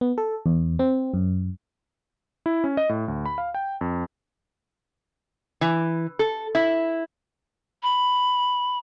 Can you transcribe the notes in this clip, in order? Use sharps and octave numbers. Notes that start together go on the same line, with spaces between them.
B3
A4
E2
C4
F#2
E4
C#4
D#5
A2
D2
B5
F5
G5
F2
E3
A4
E4
B5